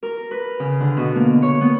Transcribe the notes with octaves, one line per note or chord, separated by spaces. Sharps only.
A#4
B4
C#3
D3
B2
A#3
C#5
B3